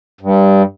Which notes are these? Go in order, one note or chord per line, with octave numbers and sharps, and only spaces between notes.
G2